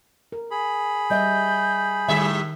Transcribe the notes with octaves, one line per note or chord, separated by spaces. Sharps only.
A#4
G#4 B5
G3 D#5 E5 G6
A2 D#3 G3 E5